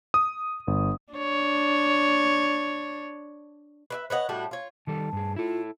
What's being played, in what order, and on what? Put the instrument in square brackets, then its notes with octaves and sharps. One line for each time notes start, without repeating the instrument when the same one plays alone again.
[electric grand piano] D#6
G1
[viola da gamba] D4 C#5
[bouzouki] B4 D5 E5
B4 C#5 D#5 F#5
A2 G3 D4 F#4
F4 C#5
[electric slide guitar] D#3 G3 A4 [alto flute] A5
[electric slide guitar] G2 G#4
[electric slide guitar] E4 A4 [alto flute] F4